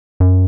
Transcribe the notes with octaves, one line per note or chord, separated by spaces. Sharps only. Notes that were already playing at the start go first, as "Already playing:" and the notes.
F#2